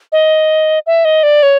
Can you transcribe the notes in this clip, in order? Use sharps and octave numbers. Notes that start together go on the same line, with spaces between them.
D#5
E5
D#5
D5
C#5